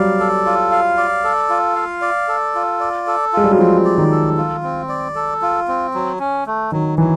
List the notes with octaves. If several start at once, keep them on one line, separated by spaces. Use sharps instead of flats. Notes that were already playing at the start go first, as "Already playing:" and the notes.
Already playing: F#3 G3 D5 F5
A4
F4
F5
D5
A4
F4
F5
D5
A4
F4
D5
A4
G#3 F4
G3
F#3
F3 C4
D5
D#3
A4
F4
C4
D5
A4
F4
C4
F#3
C#4
A3
D#3 F#3
E3 F#3